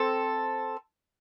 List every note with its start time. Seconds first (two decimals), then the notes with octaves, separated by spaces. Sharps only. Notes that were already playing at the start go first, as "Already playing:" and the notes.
Already playing: C4 A4